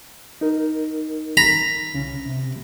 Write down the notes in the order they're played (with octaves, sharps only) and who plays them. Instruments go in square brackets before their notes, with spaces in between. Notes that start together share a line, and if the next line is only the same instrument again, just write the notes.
[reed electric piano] D#4 A#4
[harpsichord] A#5 B5
[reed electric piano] C2 C#3 C#4
C3